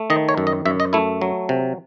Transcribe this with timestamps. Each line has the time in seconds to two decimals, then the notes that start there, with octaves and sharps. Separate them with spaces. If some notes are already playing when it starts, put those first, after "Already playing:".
Already playing: A3
0.10 D#3 D#5
0.29 C#5
0.38 F#2
0.47 D#5
0.65 F#2 E5
0.80 D#5
0.93 A3 E4
1.22 F#3
1.49 C3